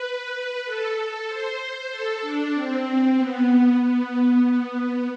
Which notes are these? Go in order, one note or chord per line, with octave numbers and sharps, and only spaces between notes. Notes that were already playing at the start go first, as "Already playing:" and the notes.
Already playing: B4
A4
C5
A4
D4
C4
B3
B3
B3